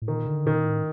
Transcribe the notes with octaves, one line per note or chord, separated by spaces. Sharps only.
A2
A#2 D#3
D3
A#2 D#3
A2